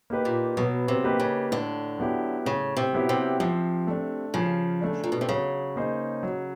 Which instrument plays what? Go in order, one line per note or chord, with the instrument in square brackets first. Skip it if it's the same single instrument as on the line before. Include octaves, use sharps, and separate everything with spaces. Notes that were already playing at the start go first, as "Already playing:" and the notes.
[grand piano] A#3 D#4 G4 B4
[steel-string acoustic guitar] A#2
[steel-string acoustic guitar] B2 [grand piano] F#3
[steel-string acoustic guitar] C3
[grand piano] A#3 D#4 G4 B4
[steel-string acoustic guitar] C#3
[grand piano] A2 [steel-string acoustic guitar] D3
[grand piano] F#3 B3 E4 G4
[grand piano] A2 [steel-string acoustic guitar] C#3
[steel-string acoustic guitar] C3
[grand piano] F#3 B3 E4 G4
[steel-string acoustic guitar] C3
[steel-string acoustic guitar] C3 [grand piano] F3
[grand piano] A3 D4
[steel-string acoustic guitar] C#3 [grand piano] F3
[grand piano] A3 D4
[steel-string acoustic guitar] A#2
B2
C3
[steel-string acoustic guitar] C#3 [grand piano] F#3
[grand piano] A#3 D#4 G#4 C5
F#3